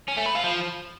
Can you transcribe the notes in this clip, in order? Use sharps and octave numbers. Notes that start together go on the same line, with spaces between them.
C#4
A3
B4
F4
F3